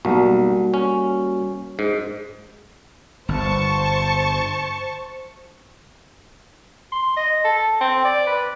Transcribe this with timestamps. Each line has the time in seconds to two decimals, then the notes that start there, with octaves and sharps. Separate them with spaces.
0.05 B1 G3 A#3 F#4
0.74 C#4
1.79 G#2
3.29 G1 C5 A5 C#6
6.92 C6
7.17 D#5
7.45 A4
7.81 C4
8.05 D5
8.27 B4